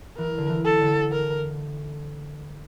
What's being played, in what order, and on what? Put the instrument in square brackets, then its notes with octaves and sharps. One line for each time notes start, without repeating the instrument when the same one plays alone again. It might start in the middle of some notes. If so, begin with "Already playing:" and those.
[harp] E3 [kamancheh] A#4
[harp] D3
E3
[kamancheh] A4
[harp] D3
[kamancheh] A#4